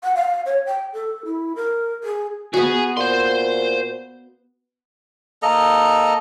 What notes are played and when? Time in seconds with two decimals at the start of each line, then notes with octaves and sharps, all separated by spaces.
0.03 F#5
0.16 F5
0.46 C#5
0.66 G5
0.93 A4
1.25 E4
1.56 A#4
2.04 G#4
2.54 B3 F#4 G#4
2.97 A#2 C5 C6
5.42 A#3 A4 D#5 A#5